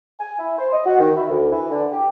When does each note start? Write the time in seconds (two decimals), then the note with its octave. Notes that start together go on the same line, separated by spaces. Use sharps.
0.20 G#5
0.39 E4
0.58 C5
0.73 D#5
0.86 F#4
0.99 D#3
1.16 E4
1.30 D2
1.51 E3
1.70 D3
1.92 G4